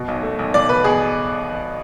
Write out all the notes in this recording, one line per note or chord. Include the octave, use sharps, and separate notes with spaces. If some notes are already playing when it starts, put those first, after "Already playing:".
Already playing: B2
B1
A3
B1
B1 D5
B2 B4
B2 G#4